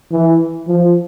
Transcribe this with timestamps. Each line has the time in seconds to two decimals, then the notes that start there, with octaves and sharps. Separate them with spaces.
0.12 E3
0.68 F3